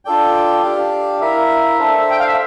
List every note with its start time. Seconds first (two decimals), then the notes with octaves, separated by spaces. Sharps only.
0.05 D4 F4 A4 D5 G5
0.63 D4 G4 D5 F5
1.20 E4 A#4 E5 F5
1.79 D4 A4 C5
2.09 G5
2.19 F5
2.27 E5